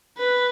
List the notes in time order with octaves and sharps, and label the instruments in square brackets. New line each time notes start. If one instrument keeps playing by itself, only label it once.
[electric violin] B4